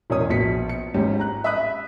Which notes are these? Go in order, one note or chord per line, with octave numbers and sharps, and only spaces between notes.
E1 C#4 A#4 C#5 D#6
A#1 B2 B6 C#7
C#7
G#1 G#2 C#4 G4
A#5 F#6
E5 B5 D#6 F#6